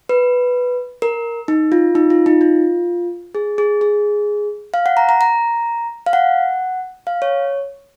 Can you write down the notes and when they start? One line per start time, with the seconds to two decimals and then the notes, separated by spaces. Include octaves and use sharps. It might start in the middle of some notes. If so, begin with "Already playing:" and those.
0.09 B4
1.02 A#4
1.48 D#4
1.72 F4
1.95 D#4
2.10 F4
2.26 D#4
2.41 F4
3.35 G#4
3.58 G#4
3.81 G#4
4.74 F5
4.86 F#5
4.97 A#5
5.09 A#5
5.21 A#5
6.06 F5
6.13 F#5
7.07 F5
7.22 C#5